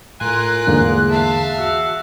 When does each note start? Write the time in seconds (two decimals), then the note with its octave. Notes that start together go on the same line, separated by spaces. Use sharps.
0.20 A2 F4 A#4 G#5 F#6
0.67 E2 G#2 D3 A#3 G#4
1.09 E5 F5 A5
1.58 F#4 E6